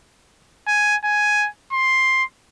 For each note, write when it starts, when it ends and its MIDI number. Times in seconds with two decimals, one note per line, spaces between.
0.67 0.95 80
1.04 1.48 80
1.73 2.24 84